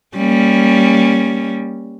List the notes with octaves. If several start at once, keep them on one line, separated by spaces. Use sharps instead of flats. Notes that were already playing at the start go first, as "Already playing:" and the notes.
G3 A#3 C#4